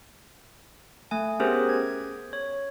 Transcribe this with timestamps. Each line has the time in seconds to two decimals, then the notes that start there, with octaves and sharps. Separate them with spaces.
1.11 A3 G#5
1.40 B3 C#4 G4 G#4 A#4 C5
1.69 G#6
2.33 C#5